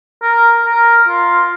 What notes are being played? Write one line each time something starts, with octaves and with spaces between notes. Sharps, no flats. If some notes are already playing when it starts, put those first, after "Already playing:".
A#4
A#4
F4